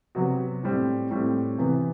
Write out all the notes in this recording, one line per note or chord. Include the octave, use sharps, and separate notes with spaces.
C3 F#3 B3 F#4
A2 G3 C4
A2 G3 C4
C3 E3 B3